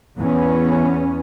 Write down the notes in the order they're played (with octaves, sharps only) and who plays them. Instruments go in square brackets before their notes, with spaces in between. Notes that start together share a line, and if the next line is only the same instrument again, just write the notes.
[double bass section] E2 B3 C#4